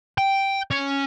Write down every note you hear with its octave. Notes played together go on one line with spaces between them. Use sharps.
G5
C#4